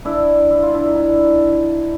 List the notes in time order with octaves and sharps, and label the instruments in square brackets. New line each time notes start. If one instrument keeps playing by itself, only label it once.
[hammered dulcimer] D4 E4
E4
F4
D4 E4
D#4
D4 E4